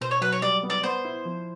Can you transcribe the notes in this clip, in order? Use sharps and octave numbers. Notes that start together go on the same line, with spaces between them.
B2 C5
C#5
F#3 B4
C#5
G3 D5
B3
D5
B3 C5
E4
F3